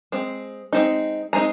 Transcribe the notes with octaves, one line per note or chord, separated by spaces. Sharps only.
G#3 C4
G#3 C4 D#4
G#3 C4 D#4 A#5